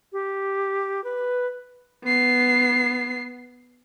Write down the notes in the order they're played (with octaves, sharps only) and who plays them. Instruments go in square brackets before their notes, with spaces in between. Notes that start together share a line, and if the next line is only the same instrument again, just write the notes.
[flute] G4
B4
[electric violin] B3 C7